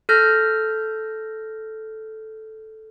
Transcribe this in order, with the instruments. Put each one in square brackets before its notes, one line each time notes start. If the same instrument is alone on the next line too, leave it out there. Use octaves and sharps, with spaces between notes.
[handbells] A4 F6 G6 A#6